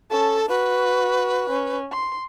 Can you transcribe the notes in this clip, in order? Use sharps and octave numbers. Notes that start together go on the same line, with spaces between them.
C#4 A4 A5
F#4 B4
C#4
C6